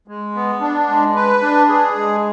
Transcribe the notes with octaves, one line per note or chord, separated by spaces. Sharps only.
G#3
B3
D4
G#3
B4
D4
G#4
G#3